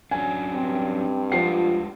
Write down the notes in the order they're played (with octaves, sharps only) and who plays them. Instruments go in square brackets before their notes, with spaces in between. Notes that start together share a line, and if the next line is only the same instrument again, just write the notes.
[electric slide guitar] F#3 C#4 D4 [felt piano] G#5
[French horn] G2 [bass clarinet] C4
[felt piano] F3 C7 [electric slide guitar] G#3 F4 F#5